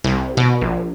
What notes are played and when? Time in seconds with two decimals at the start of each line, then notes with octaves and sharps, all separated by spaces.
0.04 C2
0.37 B2
0.61 A#1